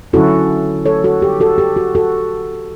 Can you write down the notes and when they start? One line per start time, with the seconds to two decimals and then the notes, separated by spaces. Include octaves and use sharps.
0.13 D3 F#3 C#4 E4 F#4 A4
0.86 A4 C#5
1.04 F#4 A4
1.22 G4
1.40 F#4 A4
1.58 G4
1.77 F#4
1.95 F#4 A4